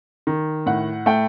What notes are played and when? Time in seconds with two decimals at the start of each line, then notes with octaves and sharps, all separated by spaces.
0.27 D#3
0.66 A2 F#5
1.06 A3 G5